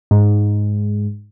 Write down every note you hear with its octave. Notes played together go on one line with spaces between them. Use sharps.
G#2